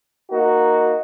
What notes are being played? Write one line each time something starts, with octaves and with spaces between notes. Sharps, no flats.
A#3 D#4 F#4